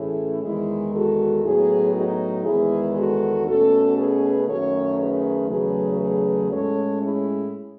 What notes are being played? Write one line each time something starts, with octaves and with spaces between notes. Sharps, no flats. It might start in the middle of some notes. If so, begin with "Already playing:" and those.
Already playing: A2 E3 A3 C#4 E4 G#4
E2 D#3 G#3 E4 G#4
F#4 A4
A2 F#3 B3 E4 G#4
D#4 F#4
E2 D#3 G#3 B3 E4 G#4
F#4 A4
B2 A3 C#4 F#4 A4
G#4 B4
F#2 D#3 A3 C#4 A4 C#5
G#4 B4
E2 C#3 F#3 A3 G#4 B4
G#4 B4
A2 G#3 C#4 A4 C#5
E4 G#4